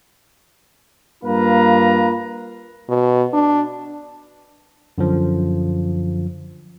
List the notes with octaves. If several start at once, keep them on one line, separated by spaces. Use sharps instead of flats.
G2 A#3 F4 B4 F5 A#5
B2
D4
F#2 D3 F3